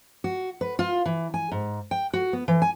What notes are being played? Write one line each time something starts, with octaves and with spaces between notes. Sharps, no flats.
F#4
B4
F4
E3
G#5
G#2
G5
F#4
B3
E3
G#5